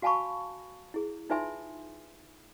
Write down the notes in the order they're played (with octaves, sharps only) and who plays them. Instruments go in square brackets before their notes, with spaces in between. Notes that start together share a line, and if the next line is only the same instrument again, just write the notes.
[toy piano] F#4 F5 G#5 A5 B5 C#6
E4 G#4
D#4 F4 B4 E5 G#5 C6